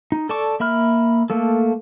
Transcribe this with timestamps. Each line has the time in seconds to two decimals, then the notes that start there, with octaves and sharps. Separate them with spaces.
0.12 D#4
0.29 A4 D5 A5 C#6 D6
0.60 A#3 E5 B5 F6
1.30 A3 A#3 A4